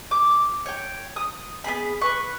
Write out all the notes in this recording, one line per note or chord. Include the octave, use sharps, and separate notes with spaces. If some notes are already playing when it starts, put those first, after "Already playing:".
D6
C#5 G5
D#6
B3 G#4 B5
B4 C#6